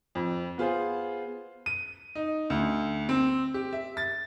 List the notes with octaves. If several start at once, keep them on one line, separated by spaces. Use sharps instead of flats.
F2
B3 F4 G#4 C5
D#7
D#4
D2
C4
G4
E5
A6